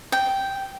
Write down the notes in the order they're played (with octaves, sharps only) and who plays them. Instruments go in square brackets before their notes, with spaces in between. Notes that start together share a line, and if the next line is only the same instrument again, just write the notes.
[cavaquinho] G5